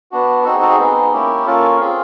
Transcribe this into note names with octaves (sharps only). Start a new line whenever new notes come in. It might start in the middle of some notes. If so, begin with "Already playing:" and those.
B3 D4 F#4
C4 D#4 F#4 A4
G#4
A4
G#4
G#3 B3 D#4
A#3 C#4 E4 G4
A#3 C#4 F4 A4
C4 F4 G#4